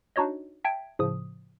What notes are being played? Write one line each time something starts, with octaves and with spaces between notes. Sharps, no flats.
D4 D#4 F#4 C#5 D#5
E5 G5 A5 G#6 B6 D7
A2 C#3 F3 D#6